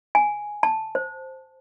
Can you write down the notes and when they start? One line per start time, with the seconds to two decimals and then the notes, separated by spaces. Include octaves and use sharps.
0.15 G#5
0.63 A5
0.95 C5